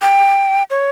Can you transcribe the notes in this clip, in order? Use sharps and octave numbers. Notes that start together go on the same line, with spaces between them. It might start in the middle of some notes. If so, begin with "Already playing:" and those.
G5
C#5